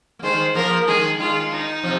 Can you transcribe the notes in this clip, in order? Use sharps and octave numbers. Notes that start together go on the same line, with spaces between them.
A#3
D#3 G#3 C5
F3 A#3 A#4
D#3 G#3 G#4
D#3 G#3 F4
D#4
C3 F3